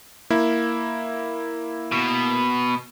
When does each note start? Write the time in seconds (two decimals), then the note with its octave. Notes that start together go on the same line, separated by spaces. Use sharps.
0.30 A#3 E4
1.92 B2